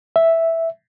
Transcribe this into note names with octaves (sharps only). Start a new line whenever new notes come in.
E5